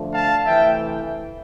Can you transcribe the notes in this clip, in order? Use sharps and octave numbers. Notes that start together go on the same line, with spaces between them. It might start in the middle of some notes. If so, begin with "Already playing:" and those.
Already playing: D3 F3 A3 D4
F5 A5
C3 E3 A3 E5 G5